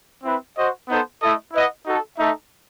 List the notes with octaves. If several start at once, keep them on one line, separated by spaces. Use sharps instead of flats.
C4 E4 B4
F#4 C5 D#5
B3 D#4 A4 C5
A3 E4 A4 D#5
E4 B4 D#5 F#5
D#4 F#4 A4
A3 D#4 A4 E5